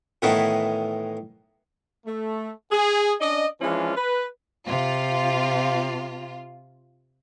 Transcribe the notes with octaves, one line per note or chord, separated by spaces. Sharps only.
A2 D#3 E3 B3 D#4
A3
G#4
C#4 D4 D5 D#5
E3 F3 G#3 C#4 D4 F4
B4
C3 F4